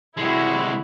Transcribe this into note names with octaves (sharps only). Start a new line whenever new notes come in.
C2 G#3 E4 F#4